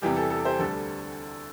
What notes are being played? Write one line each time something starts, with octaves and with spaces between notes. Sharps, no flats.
E2 C3 E3 G3 G4
A4
A4
G4 C5
D2 D3 G3 A4